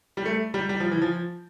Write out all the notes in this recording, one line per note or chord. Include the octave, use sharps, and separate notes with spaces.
G3
A3
G3
G3
F3
E3
F3